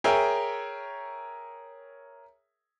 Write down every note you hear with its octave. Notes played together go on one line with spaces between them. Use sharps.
G#4 A#4 C#5 E5 G5